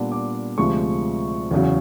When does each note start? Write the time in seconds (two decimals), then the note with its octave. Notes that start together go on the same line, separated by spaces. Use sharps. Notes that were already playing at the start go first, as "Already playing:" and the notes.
Already playing: A#2 G3 B3 D4
0.12 D6
0.58 D2 C3 F3 G#3 C#6
1.51 E2 C#3 F#3